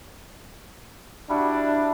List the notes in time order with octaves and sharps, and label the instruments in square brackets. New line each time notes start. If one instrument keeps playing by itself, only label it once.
[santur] G3 E4 F#4 [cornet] D4